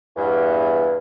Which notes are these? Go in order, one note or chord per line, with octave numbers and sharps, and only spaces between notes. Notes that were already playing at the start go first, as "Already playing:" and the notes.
E2 G2